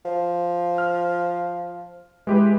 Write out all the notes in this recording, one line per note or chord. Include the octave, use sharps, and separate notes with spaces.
F3
F6
E3 G#3 G4 B4